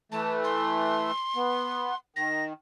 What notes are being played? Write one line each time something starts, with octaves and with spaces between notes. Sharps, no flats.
E3 A3 A5
C6
B3
D#3 A#6